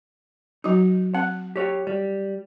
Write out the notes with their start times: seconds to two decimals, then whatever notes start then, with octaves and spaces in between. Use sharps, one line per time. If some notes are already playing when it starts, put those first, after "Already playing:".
0.64 F#3 D#4 F#4
1.15 C4 F#5
1.56 G4 C#5
1.87 G3